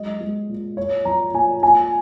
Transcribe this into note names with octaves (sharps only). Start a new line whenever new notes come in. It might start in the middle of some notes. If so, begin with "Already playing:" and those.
Already playing: F#3 G#3 D#5
G#3
A#2
A#2 C#5
F3 A#5
A#2 G#5
A#2 G#5